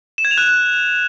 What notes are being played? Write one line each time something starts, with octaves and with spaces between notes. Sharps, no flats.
E7
G#6
F7
F#6